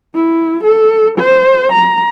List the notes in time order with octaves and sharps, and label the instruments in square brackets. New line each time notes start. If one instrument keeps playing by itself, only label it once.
[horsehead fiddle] E4
A4
C5
A#5